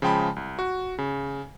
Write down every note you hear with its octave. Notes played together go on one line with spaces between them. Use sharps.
C#3 F3 G#3 G5 A5 B5
C2
F#4
C#3